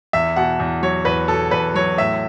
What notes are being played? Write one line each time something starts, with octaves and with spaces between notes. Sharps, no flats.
E2 E5
B2 F#5
E2
F#3 C#5
E2 B4
B2 A4
E2 B4
F#3 C#5
A2 E5